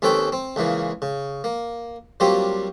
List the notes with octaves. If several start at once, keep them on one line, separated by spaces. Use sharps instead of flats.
D#2 C4 C#4 A4 B4 G5
C4
C#2 C#3 E3 A#3
C#3
A#3
F#3 G3 A#3 C4 F4 G4